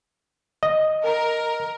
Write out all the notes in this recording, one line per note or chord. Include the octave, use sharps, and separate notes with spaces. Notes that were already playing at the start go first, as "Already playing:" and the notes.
D#5
A#4